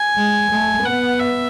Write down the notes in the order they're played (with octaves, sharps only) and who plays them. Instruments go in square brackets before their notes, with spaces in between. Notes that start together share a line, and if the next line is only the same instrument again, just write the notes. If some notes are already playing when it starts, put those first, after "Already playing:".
Already playing: [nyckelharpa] G#5
[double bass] G#3
A3
[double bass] B3 [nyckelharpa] F#5
[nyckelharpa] E5